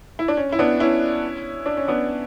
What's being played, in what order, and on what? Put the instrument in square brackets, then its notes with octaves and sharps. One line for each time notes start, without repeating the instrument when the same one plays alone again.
[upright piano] E4
D4
C#4
E4
B3 D4
C#4 E4
D4
C#4
B3 D4